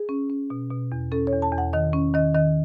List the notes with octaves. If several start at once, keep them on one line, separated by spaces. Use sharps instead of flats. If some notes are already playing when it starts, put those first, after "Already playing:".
Already playing: G#4
C#4
C#4
B2
B2
E2
C#4 A4
C#5
E2
A5
E2
F#5
D#3 D#5
C#4
D#3 D#5
D#3 D#5